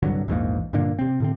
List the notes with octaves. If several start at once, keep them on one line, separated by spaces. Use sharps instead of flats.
C2 G2 D3 F#3
A#1 E2 G#2 A#3
G2 A#2 D3 A#3
C3 C4
A2 D3 C4